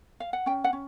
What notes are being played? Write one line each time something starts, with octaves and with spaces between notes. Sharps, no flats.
F5
F#5
C#4 G5
F#5
C#4